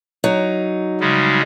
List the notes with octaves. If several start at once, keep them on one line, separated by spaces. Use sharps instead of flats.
F#3 D#4
C#3 G3 G#3